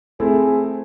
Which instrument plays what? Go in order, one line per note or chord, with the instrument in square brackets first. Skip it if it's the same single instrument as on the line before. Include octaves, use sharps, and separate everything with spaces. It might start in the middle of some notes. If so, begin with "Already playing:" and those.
[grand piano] A3 C4 E4 A4 [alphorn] G#4